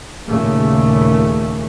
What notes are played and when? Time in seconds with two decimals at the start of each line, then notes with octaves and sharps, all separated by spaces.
0.25 D#2 A#2 C#3 A3